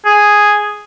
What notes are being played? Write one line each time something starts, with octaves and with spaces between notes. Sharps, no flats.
G#4